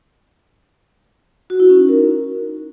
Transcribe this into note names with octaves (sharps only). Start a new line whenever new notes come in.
F#4
E4
C#4
D#4
A#4